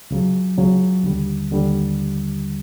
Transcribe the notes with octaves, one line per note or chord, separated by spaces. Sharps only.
C#2 C#3 F#3
C#2 C#3 F#3
D#2 D3 G3
D#2 D3 G3